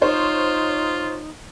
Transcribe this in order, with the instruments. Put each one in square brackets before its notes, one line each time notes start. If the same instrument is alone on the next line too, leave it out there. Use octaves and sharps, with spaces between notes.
[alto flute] D#4 [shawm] F4 [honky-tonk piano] C5 C#5